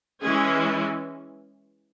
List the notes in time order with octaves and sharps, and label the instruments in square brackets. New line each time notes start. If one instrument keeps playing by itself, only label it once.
[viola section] E3 G#3 C#4 G#4